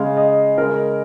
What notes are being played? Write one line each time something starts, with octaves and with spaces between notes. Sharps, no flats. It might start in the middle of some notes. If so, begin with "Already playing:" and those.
Already playing: C#3 G#3 F5
D#5
C#3 G#3 A#4